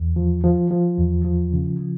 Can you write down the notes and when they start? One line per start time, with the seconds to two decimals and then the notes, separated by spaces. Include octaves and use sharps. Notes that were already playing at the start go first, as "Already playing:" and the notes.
Already playing: E2
0.16 F3
0.44 F3
0.71 F3
0.98 E2
1.24 F3
1.53 C#3
1.79 F3